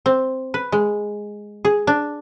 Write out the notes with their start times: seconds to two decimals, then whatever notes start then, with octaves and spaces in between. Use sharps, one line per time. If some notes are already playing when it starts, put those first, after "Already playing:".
0.06 C4
0.54 B4
0.72 G#3
1.65 G#4
1.87 D4